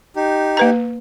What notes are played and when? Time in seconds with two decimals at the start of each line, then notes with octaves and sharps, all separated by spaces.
0.16 D#4 G4
0.57 A#3 B4 A#5